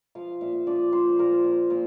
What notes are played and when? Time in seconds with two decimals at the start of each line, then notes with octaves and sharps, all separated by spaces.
0.15 F3 F5
0.41 A#2 E5
0.67 F3 D5
0.93 F3 C5
1.09 C5
1.19 A#2 A#4
1.44 A#2
1.70 A#2